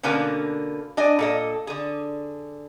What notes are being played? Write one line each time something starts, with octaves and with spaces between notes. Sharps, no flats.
B2 D3 A#3 C#4 B4
D4 D#5 G#5
A#2 A4 D#5
D3 G#4